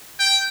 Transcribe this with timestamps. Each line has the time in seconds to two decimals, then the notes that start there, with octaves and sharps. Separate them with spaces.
0.20 G5